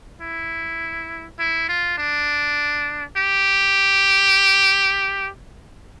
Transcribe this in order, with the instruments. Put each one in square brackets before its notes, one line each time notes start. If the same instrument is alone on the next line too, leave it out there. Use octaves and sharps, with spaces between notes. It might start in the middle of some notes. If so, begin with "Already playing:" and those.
[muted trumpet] E4
E4
F4
D4
G4